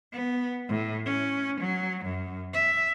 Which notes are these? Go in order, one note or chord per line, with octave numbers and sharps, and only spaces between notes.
B3
A2
C#4
F#3
F#2
E5